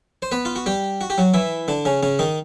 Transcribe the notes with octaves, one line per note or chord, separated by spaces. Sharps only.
C5
B3 B4
F4
F#4
G3 G4
F#4
G4
F#3 F#4
E3 E4
D3 D4
C#3 C#4
C#3 C#4
D#3 D#4